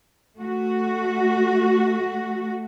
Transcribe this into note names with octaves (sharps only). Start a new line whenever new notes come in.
A3 F#4